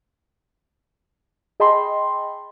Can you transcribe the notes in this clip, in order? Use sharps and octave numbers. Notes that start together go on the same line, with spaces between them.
G#4 D#5 G5 A5 B5 C6